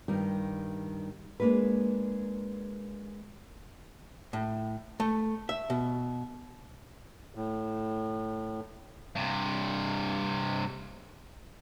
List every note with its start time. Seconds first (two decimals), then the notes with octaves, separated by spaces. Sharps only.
0.08 G2 D#3 G3
1.40 G#3 A#3 D4 B4
4.33 A2
5.00 A3
5.49 E5
5.70 B2
7.35 A2
9.15 G2 C3